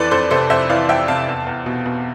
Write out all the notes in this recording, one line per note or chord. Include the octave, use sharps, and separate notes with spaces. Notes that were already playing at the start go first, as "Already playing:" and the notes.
Already playing: F2 E3 A4 B4 C5 D5
F2 A4 C5
C3 A4 C5
F2 C5 E5
E3 D5 F5
F2 E5 G5
C3 F5 A5
E2
E2
B2
B2